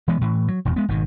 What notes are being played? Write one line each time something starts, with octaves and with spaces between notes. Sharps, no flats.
E3 G#3 B3
A2 E3
F#3
E1 E2 A#2
G#3 B3
G#1 B2 D#3